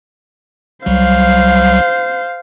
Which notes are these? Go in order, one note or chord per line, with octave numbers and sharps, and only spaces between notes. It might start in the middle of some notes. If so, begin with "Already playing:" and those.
C2 F#3 G3 C5 F5